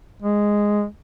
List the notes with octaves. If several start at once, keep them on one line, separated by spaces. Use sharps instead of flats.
G#3